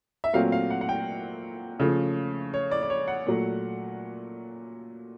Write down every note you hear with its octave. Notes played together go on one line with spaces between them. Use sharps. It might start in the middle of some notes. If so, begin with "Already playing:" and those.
E5
A#2 F#3 A3 C4 F5
F5
F#5
F#5
G5
C#3 F3 A3
C#5
D5
D5
C#5
F#5
A#2 F#3 A3